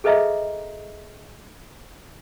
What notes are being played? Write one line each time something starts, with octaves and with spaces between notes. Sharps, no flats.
G#4 A4 B4 D#5 E5 A#5